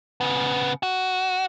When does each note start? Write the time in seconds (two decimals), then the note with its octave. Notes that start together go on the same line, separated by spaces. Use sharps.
0.21 C#3 B3
0.83 F#4